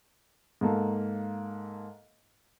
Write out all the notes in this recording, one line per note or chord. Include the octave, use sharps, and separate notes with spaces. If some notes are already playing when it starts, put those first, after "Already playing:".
G#2 A#3 A4 F5